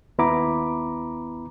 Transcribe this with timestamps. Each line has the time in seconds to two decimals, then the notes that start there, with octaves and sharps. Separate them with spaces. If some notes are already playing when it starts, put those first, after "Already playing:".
0.18 D#2 B3 E4 A#5 B5 D6